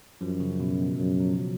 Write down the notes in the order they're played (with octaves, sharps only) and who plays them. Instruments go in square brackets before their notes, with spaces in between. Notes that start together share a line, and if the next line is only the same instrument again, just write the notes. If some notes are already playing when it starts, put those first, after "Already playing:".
[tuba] F#2 [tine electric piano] F3
[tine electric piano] C#3
B2
B2
[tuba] F#2 [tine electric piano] F#3
[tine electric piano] F#3
F3